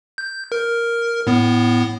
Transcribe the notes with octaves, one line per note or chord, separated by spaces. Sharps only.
G6
A#4
A2 B3